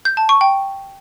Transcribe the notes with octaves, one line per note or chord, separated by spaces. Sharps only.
G6
A5
C#6
G5